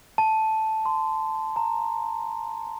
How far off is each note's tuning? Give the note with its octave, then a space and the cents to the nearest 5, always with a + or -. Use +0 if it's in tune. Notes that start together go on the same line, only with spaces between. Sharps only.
A5 -5
C6 -20
A#5 -10